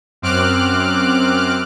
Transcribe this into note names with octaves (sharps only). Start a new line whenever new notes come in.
F#2 C4 D6 F6 F#6 D7